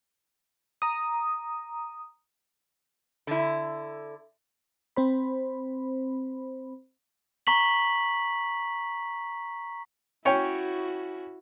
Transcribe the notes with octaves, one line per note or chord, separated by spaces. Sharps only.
A#5 D#6
D3 E4
C4 C5 B5
A#5 C#6 B6 F#7
C#4 E4 F#4 C#5 G5